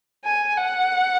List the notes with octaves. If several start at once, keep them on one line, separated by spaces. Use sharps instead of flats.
G#5
F#5